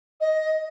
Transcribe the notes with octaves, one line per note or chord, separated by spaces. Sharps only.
D#5